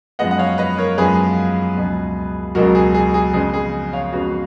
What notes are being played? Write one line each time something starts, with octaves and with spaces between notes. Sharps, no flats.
F#2 F3 G#3 B3 D#5 F#5
F#5
C#5 F5
B4 D#5
A#4 C#5
F#2 F3 G#3 B3 G#4 B4
C#2 B2 F#3
C#2 B2 F#3 F#4 A#4
G#4
G#4
G#4
F2 C#3 G#3 B3 G#4
G#4
C#5 F5
F2 C#3 G#3 B3 F#4